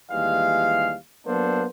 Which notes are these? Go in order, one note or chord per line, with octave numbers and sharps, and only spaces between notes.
D#2 E3 G3 G#3 F5
F#3 A#3 B3 D4 A4 C5